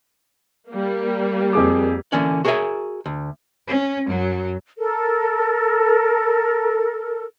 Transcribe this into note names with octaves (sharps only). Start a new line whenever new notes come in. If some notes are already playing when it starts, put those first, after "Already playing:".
G3 A#3
F2 G#4 D6
D3 E3 A#3 C#4 D5
F#4 G#4 A#4 C#5 E5 G#5
D2
C#4
F#2 F#3
A4 A#4